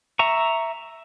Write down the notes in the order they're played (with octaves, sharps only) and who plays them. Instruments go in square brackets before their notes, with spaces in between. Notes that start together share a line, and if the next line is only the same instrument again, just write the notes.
[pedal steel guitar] E5 A#5 C#6